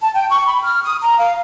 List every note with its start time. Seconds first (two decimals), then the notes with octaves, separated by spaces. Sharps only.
0.01 A5
0.14 G5
0.30 C#6
0.47 B5
0.62 F6
0.83 D#6
1.02 A#5
1.18 F5